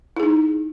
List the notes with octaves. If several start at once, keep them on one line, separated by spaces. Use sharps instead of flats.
D#4 E4 G#4